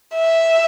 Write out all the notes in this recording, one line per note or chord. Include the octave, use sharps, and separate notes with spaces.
E5